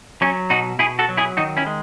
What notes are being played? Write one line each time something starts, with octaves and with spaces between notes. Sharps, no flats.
F#3 C#4
B2 D#4 F#4
B2 E4 G#4
F#4 A4
F#3
E4 G#4
D#3 D#4 F#4
C#4 E4
G#3